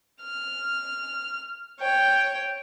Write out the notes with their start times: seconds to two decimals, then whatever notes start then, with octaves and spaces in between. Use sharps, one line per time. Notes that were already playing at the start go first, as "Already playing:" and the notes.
0.23 F6
1.80 C#5 G5